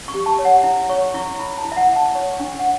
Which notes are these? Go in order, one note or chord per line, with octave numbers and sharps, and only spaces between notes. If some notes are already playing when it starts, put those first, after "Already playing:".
C#6
G4
A5
C#5
F#5
E4
C#5 C#6
E4 C#6
E4 B5
A5
E4
E5
F#5
E4
A5
C#5 C#6
C#6
D4
F#5